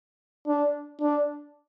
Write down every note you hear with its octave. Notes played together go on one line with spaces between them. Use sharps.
D4
D4